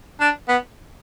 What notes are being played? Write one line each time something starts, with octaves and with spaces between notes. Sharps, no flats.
D4
B3